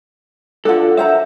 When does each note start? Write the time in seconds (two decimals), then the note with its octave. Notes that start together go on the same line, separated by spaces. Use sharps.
0.65 D4 F4 A4 F#5
0.97 C5 E5 F#5 A#5